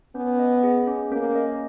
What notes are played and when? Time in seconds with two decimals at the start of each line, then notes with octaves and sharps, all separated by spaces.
0.15 B3 C#4
0.39 D#5
0.63 G#4
0.87 C#4
1.11 A#3 C#4
1.35 D#5